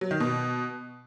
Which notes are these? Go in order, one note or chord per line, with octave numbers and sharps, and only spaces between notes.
F#3
D#3
B2